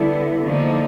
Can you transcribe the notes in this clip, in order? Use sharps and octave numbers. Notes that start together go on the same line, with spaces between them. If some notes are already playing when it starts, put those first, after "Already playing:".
Already playing: D3 G3 B3 E4
D3 F3 A#3 D#4